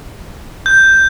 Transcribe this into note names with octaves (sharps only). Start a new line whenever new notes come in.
G6